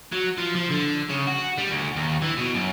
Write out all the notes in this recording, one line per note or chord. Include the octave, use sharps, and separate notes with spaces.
F#3
F3
F3
D3
C#3
F#4
G3
D2
D#2
E3
B2
F#2